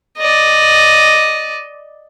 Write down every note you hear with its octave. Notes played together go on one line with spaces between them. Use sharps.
D5 D#5